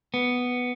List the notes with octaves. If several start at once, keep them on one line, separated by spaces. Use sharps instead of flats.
B3